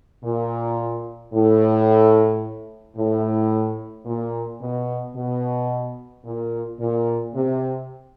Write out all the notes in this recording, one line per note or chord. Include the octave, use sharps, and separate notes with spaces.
A#2
A2
A2
A#2
B2
B2
A#2
A#2
C3